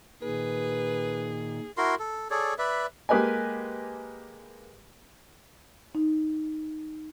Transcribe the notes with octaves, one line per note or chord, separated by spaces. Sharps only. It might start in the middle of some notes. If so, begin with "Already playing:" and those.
A#2 D#3 G#4 B4
E4 F#4 A#4 C6
A4
G#4 A4 C#5 D5
B4 D5 E5
G#3 A#3 G4 B4 D#5 G#5
D#4